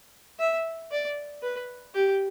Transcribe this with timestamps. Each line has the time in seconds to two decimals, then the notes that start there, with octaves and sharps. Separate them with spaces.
0.40 E5
0.91 D5
1.43 B4
1.95 G4